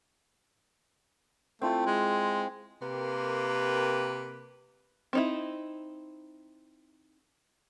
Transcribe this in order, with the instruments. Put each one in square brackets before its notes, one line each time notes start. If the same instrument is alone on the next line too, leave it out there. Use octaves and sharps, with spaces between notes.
[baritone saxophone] A3 [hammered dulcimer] C4 E4 F4
[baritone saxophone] G#3
[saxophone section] C3 A#3 G4 A#4 B4
[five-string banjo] C4 D#4 E4